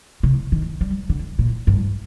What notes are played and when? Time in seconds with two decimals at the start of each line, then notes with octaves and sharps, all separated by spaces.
0.23 C3
0.52 D#3
0.81 G3
1.09 D3
1.39 A#2
1.67 G2